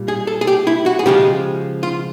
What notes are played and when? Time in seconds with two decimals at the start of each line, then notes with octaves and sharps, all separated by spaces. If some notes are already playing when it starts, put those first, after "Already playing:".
Already playing: A#2 G3
0.08 G#4
0.27 A4
0.41 G#4
0.47 G4
0.67 E4
0.86 F#4
0.99 G#4
1.06 C#3 F3 G#3 G4
1.83 F4